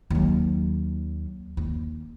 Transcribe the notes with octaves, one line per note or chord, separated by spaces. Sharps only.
D#2 F#3
D#2